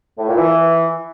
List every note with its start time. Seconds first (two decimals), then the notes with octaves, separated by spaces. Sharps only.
0.18 A2
0.28 A#2
0.37 E3